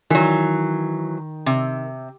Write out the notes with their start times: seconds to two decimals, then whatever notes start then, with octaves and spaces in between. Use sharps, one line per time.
0.10 D#3 E3 F#3
1.46 C3